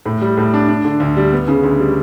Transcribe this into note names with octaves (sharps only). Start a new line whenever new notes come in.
A2
G3
A2
D4
D4
D3
D2
G3
B3
C#3
D2
G3